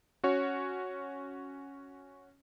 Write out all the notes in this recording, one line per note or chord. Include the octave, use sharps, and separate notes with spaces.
C#4 F#4 C#5